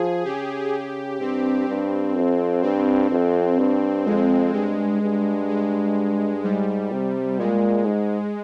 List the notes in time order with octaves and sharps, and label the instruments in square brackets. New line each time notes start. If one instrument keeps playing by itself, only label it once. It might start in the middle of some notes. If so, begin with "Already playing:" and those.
Already playing: [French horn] F3 [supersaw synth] G#4
[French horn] C#3 [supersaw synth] G4
[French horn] G2 [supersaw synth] C4
[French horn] G2
F2
[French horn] G2 [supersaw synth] C4
[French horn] F2
G2
[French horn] F2 [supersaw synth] G#3
[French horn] G2 [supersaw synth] G#3
[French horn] G2
[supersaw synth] G#3
[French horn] G#2 [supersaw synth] G3
[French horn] C3
[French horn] A#2 [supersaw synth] G#3
[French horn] G#2